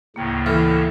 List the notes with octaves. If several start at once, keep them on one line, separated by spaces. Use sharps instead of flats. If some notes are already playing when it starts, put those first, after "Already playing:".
D2 A2 C#3 A#3 G5
E3 A4 B5 F6